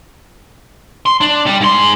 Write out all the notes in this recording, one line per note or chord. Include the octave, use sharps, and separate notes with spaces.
C6
D4
G3
G#2 C6